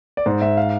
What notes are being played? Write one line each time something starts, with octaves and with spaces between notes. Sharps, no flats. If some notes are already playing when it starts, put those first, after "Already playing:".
D5
G#2 C5
G#2 E5
F5